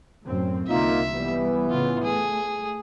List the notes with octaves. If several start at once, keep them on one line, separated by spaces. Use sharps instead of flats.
F#2 A2 C4
C2 D3 A#3 D#4 F4 E5
E3 G3 B3
A2 C#3 F4
A3 G#4